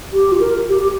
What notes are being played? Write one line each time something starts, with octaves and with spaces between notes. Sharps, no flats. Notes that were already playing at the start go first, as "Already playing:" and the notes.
G4
F4
A#4
G4
G4